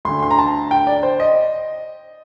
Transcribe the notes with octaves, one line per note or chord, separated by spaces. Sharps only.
D2 D3 C6
C6
A#5
A5
G5
D5
C5
D#5